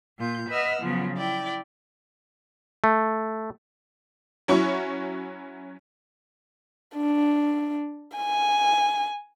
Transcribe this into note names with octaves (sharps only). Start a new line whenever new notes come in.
A#2 F4 G6
B4 D#5 E5 F#5 E6 F6
C#3 F3 F#3 B3
E4 D5 G5
A3
F#3 C#4 E4 F#4 C#6
D4
G#5